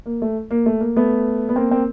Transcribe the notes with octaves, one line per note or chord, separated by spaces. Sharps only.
A#3
A3
A#3
A3
A#3
A3 B3
B3
A#3 C4
A#3 C4